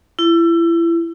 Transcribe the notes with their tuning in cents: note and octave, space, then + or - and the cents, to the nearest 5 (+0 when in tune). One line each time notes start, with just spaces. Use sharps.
E4 +30